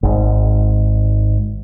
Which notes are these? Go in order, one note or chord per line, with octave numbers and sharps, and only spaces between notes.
G#1 G#2